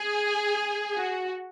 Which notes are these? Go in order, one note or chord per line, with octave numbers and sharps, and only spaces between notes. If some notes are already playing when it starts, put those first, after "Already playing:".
Already playing: G#4
F#4